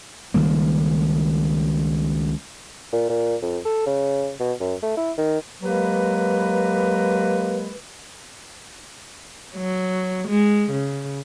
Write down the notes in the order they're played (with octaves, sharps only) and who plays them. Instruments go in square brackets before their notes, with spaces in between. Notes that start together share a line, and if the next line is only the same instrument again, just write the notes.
[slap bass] C#2 D#3 G3 A#3
[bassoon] A#2
A#2
F2
A4
C#3
B2
F#2
A3
E4
D#3
[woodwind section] F#3 G#3 A#3 G4 A#4 B4
[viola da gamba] F#3
G#3
C#3